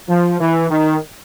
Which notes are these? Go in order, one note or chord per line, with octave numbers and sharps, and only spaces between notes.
F3
E3
D#3